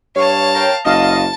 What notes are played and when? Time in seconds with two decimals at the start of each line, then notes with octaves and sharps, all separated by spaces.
0.16 G2 C#5 F5 A5
0.55 A#4 G5
0.85 F#1 D#5 F5 A5